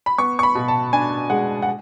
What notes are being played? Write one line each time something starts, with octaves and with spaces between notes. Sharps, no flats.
B5
B3 C#6
C#6
B5
B2
A5
D4 G#5
G#3 F#5
F#5